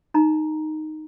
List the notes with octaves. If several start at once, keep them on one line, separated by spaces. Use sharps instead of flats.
D#4 A#5